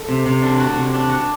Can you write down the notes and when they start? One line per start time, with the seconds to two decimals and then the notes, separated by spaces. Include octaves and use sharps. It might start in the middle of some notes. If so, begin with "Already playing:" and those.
Already playing: A4
0.09 C3
0.26 C3
0.42 D4
0.60 F#4
0.76 C3
0.93 D4
1.10 F#4